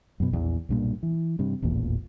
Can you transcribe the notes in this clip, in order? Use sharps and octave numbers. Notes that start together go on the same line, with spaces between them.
F#2 B2
A#1 E2 E3
B1 G2 A#2
E3
G2 C3
D#1 A1 E2 A#2